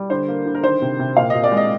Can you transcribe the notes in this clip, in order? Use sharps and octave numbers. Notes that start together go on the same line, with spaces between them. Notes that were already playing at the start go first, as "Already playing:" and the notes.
Already playing: G3
D3 C5
A#3
D3
A#4
D#3 C5
C3
C3
A#2 F5
A#2 D#5
D5
G#3
D#5